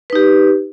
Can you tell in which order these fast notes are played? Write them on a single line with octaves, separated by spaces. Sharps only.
B4 D#4 G4